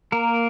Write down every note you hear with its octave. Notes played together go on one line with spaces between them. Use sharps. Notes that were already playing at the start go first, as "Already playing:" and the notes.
A#3 A#4